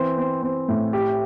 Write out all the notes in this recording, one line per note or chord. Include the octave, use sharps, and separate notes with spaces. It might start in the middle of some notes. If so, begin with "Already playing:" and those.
Already playing: E3 C4
C4
C4
A2
G4